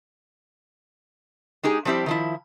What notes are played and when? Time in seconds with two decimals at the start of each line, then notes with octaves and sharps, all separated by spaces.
1.63 G#3 D#4 G4 G#4
1.85 F3 G3 C4 E4 G4
2.06 D#3 F3 E4